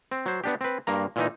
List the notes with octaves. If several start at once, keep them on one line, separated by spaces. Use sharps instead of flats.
C4
F#3 C5
B3 D4 G4
C4 B4
G2 A#3 A#5
A#2 E3 D#4